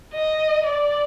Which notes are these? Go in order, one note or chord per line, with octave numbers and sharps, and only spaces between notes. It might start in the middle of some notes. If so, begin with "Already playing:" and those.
D#5
D5